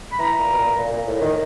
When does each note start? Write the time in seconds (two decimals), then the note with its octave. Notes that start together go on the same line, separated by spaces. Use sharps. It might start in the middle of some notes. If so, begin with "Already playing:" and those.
0.12 B5
0.19 E3 A#5
0.39 A#2
0.53 B2
0.58 A#2
0.78 A#2
0.92 A#2
1.07 A2
1.22 D#3